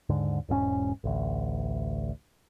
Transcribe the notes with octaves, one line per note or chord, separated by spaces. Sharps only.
D#2 G#2 D3
E1 G#2 A3 C#4
A1 D2